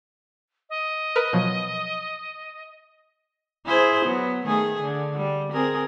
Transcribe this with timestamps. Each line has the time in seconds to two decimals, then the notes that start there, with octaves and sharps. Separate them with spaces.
0.70 D#5
1.16 A#4 B4
1.33 B2 F3 F#3
3.67 E4 G#4 C5
4.05 F#3 B3
4.46 D#3 A3 G#4
4.81 D3
5.16 G3
5.52 C4 G#4 A#4